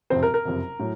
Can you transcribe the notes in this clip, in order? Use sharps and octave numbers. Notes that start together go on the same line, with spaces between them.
F#1 F2 C3 C4 C5
A#4
A#4
F#1 F2 C3
A2 F#3